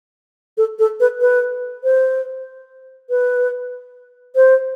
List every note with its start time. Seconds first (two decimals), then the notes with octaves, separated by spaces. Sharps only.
0.58 A4
0.79 A4
1.00 B4
1.21 B4
1.84 C5
3.10 B4
4.36 C5